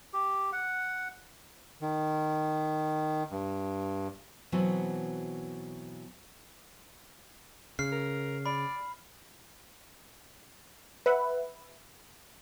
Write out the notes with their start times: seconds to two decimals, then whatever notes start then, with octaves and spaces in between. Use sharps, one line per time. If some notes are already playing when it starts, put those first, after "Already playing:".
0.13 G4
0.52 F#5
1.82 D#3
3.31 G2
4.52 B2 E3 F#3 B3 C4
7.79 C#3 F6 C7
7.92 A#4
8.46 D5 B5
11.06 B4 E5 F#5